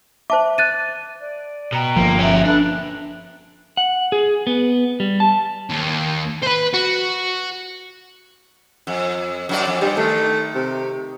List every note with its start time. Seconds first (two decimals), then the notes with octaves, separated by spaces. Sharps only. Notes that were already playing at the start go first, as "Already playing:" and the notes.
0.30 C5 E5 A5 D6
0.58 F#6 A6 D#7
1.21 D5
1.72 B2 G5 A#5
1.97 G1 F3 A#3
2.19 C#4 E5
2.45 D4 A4 B4 F#6
3.77 F#5
4.12 G#4
4.47 B3
5.00 G3
5.20 A5
5.70 D#2
6.42 B4 C5
6.73 F#4
8.87 F2
9.49 F#2 F#3 D5
9.67 F2
9.81 G2 G3
9.97 D#3 A3
10.55 C3